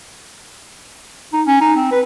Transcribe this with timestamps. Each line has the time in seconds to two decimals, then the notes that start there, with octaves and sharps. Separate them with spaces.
1.33 D#4
1.47 C#4
1.61 D#4
1.76 C4
1.92 B4